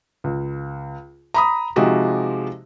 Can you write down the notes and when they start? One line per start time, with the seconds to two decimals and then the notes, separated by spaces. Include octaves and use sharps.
0.24 C#2
1.34 A#5 B5 D#6
1.76 C3 F3 G#3 D#4 F#4 G4